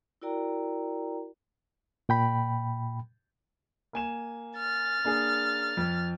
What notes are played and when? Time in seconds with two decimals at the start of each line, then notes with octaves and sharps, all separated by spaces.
0.22 E4 F#4 A#4 D5 G5 A#5
2.09 A#2 G5 B5
3.93 A#3 G#5 E7
4.58 F6 A6
5.05 A#3 D4 G#4
5.77 F2